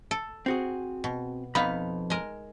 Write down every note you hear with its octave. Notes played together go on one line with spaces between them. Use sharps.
A4
C4 F#4 G#4
B2
F2 B3 D#4 F5 B5
G#3 A#4